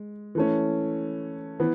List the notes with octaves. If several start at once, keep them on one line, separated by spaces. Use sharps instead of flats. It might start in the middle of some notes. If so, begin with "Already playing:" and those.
Already playing: G#3
E3 A3 C#4
E3 B3